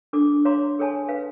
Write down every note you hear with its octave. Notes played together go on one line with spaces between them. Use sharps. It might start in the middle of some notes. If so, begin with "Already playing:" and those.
D4 A4 D6
C#5 F5 A#5 C6 D6
G#4 A4 C#5 G#5 A5
G#4 B4 F5